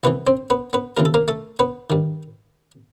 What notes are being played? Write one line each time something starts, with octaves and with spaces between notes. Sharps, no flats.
C2 C3 E3 B3 B4
C4 C5
B3 B4
B3 B4
D#2 C#3 E3 A#4
A4
A#3 A#4
A3 A4
B3 B4
G2 D#3